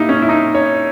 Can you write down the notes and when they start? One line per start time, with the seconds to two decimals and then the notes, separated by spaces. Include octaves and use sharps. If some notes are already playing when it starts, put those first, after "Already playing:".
Already playing: A#2 G3 A#3 D#4 E4
0.09 C#4
0.22 E4
0.29 D#4
0.55 C#5